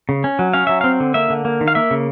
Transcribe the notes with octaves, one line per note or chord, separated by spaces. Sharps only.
C#3
C#4
F#3
C#4 F5
F#3 E5
C4 F5
D3
A#3 E5
D3
A#3
D#3
F5
A#3 E5
C#3